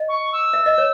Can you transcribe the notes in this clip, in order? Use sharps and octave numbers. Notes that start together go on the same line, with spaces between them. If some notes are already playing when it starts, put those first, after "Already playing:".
Already playing: D#5
C#6
E6
E5
D#5
C#5